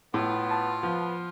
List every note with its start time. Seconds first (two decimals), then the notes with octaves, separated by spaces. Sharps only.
0.14 A2 B3 F4
0.51 A5
0.83 F3 B3